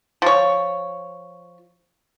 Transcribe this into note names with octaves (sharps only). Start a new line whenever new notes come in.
F3 C#5